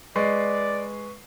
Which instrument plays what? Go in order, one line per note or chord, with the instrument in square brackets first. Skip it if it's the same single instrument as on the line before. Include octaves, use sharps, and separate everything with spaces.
[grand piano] G#3 [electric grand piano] B4 C#6 C7 [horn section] D5